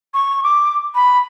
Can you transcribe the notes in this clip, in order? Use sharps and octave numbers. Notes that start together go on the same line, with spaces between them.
C#6
D6
B5